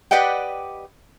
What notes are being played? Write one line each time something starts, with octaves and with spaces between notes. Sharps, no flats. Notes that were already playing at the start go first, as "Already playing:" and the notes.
G4 B4 D5 D#5 F#5 G5